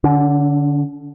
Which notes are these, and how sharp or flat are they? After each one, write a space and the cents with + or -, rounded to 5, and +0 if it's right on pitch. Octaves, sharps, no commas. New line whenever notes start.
D3 +0 C#4 +45